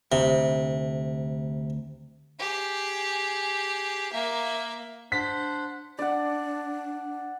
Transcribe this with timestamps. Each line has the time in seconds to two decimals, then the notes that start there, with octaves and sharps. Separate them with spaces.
0.12 D2 C3
2.39 G4 G#4
4.12 A#3 E5
5.12 D4 C5 F#5 B6
5.99 D4 D5 F#5